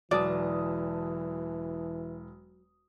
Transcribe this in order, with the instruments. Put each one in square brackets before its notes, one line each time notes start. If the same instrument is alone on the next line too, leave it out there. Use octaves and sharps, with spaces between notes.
[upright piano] E1 A5 D#6 [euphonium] E3 [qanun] F#3 [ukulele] D5